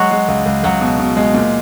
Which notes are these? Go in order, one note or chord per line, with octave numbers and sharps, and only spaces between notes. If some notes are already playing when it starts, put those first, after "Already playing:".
Already playing: F#3 G#3 F#4
G#3
C#2
C#2
C#2 F#3 F#4
B2
B2
G#3
A#2